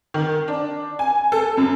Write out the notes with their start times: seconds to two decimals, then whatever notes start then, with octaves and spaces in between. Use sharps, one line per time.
0.14 D#3
0.48 D4
0.99 G#5
1.32 A4
1.57 F#2